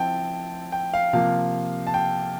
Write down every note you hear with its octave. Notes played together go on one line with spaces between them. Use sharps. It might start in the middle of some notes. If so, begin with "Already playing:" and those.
Already playing: F3 C4 E4 G5 A5
G5
F5
C3 F3 A#3 F4 F5
A5
G5